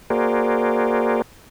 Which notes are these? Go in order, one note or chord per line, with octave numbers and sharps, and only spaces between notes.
A#3 F#4 G#4 A#4 C5 D5